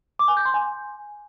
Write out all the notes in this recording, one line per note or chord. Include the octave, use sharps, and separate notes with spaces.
D6
G#5
G6
C6
G#5